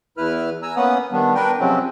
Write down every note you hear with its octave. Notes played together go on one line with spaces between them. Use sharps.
E2 E4 B4 F6
G#5 A#5 E6
A#3 B3 C#4 B4 F#5 D#6
D#3 G3 B3 D4
D4 A#4 B4 G5
C3 F3 F#3 G#3 C4 C#4